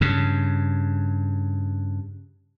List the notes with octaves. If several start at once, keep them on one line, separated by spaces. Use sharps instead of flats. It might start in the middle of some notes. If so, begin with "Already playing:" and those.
G2 C#3